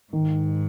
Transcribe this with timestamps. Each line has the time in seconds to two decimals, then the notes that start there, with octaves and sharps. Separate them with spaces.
0.13 G#2 D#3